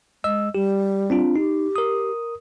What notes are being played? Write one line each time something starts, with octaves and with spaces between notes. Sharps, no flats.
G#3 D#5 E6
G3 G4
C4 D4 F4
D#4 G4
A#4 D#6